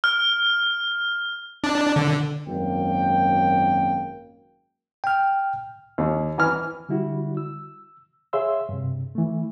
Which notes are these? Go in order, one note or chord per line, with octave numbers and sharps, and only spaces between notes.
F6
D4
D3
G#1 F#2 A#3 G5
G5 F6
D#2
E3 G#5 F6
D3 G3 E4 F#4
E6
G#4 C#5 E5 F5 C6 E6
G2 C3
E3 A3